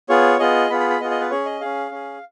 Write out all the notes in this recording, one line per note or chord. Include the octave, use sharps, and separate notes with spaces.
B3 F4 G#4 C#5
B3 F4 G#4 D#5
B3 F4 G#4 B5
B5
B5
B3 F4 G#4 D#5
D#5
B4
C#4 G#4 C#5
D#5
C#4 G#4 F5
C#4 G#4